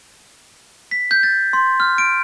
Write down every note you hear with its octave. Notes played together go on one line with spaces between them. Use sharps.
B6
G6
A6
C6
F6
D7